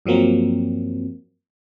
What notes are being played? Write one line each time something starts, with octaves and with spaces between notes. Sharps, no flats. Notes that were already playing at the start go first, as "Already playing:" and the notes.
G2 F3 F#3 A#3 C4